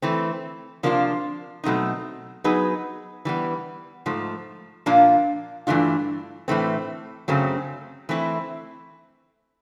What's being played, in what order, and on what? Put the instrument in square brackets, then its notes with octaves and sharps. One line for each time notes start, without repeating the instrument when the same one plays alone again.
[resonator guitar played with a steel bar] E3 A3 C4
C3 F3 A#3 D4 F4
B2 F#3 A3 C4 D#4
F#3 B3 D#4 G#4 B4
E3 G3 B3
G#2 F3 A3
A#2 F3 A#3 D4 F4
G2 E3 A3 D4 F4
A2 E3 A3 C4
F#2 C#3 F#3 A3 C4
E3 A3 C4 E4